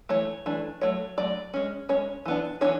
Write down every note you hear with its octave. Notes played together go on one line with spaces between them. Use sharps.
E3 A3 C#5
E3 A3 D4
F#3 A3 C#5
F#3 A3 D5
G#3 C#4
G#3 C#4 C#5
E3 B3 D4
E3 B3 C#4 D4 C#5